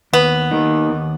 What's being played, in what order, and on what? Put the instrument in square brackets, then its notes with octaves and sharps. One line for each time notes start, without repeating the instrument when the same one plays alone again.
[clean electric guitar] D#2 [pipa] B3
[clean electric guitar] D#3 A#3 D#4
D#2